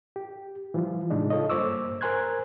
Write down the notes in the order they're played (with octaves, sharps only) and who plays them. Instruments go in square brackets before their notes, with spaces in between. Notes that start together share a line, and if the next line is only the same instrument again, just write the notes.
[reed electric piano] G4
E3 F3 G3 F4
A2 C#3 G#3 D4 D#4
F4 A4 C#5 D#5
G2 A#3 C5 C#6 D6 E6
A#4 C5 G#5 C6 F#6 G#6